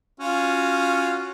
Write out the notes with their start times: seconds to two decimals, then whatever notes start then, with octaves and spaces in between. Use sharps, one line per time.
0.20 C#4 F4 F#4